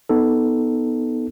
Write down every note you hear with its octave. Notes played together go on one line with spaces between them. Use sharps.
B3 D#4 A4